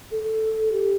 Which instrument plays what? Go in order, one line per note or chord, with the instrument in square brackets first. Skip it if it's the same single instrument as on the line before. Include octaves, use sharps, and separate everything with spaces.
[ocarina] A4
A4
G4